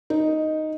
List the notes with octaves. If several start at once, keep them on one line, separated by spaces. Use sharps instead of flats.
D#4